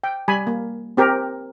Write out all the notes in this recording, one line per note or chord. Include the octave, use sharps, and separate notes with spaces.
G5
G3 G#5 B5
A#3
C4 G4 A#4